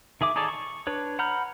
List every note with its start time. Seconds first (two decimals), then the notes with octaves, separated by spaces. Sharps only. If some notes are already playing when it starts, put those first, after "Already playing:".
0.21 D#3 G#4 E5 D6
0.36 D#4 G#4 A4 C#5 D5
0.48 C#6
0.87 D4 B4 C#5
1.19 F#5 A#5 B5 F6 G6